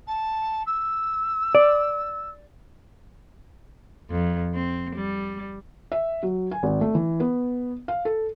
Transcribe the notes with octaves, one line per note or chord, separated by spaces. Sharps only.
A5
E6
D5
F2
C4
G3
E5
F#3
G#5
G#1
A3
E3
B3
F5
A4